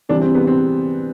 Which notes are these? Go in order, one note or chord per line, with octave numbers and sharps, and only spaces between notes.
C3 E3 G3 D4
C4
B3
C4